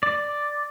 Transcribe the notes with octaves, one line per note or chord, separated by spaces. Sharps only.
D5